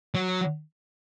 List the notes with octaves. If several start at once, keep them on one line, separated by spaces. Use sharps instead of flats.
F#3